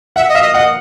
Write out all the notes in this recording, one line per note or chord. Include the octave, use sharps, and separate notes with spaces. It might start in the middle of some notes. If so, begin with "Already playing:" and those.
E5 F#5
D#5
E5 F5
D#5
D#5 F#5